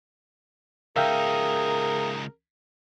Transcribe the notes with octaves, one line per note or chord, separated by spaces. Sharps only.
C#2 D#4 G#4 A#4 E5 F5 G5